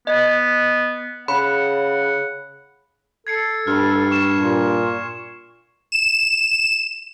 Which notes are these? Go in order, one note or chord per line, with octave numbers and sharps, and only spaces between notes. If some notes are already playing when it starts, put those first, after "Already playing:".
B3 D#5
C#3 F#5 B5
A4 G#6 C7 C#7
G2 F6
C#6 E7
A#2
E7